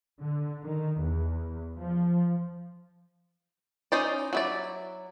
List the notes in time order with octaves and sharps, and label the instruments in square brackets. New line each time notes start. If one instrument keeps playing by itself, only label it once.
[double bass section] D3
D#3
E2
F3
[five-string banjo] C#4 D#4 C5 D5
F#3 E4 D5